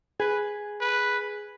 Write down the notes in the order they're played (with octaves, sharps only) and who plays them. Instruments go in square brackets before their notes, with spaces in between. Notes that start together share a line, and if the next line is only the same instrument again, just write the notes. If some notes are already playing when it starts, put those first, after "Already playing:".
[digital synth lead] G#4 [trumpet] B4
[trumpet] B4